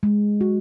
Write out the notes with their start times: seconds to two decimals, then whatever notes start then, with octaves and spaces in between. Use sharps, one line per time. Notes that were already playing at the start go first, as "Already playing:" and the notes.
0.03 G#3
0.41 F#4